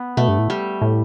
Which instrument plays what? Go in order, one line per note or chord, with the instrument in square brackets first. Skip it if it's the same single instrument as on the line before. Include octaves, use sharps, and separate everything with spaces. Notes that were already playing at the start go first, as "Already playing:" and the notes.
Already playing: [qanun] B3
[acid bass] B2 [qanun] A3
[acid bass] G2
A2
[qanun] G3
[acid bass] A2